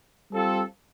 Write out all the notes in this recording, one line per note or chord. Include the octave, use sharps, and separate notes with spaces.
G3 C4 F4 A4